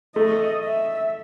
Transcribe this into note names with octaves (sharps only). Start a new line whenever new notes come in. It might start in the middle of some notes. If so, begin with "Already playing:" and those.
A3 D#5
E5